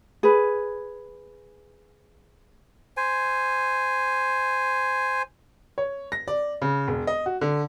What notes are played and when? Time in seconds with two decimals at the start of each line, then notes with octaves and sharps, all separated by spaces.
0.23 G#4 B4
2.97 C5 G#5
5.78 C#5
6.12 A#6
6.28 D5
6.62 C#3
6.88 E1
7.07 D#5
7.26 F#4
7.41 D3